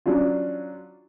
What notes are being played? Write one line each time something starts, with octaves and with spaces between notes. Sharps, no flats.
F#3 C#4 D4 F4